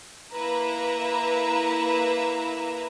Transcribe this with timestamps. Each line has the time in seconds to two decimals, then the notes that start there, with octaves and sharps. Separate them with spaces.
0.33 A#3 E4 B4 E5 A#5